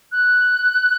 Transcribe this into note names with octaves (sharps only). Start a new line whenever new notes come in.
F#6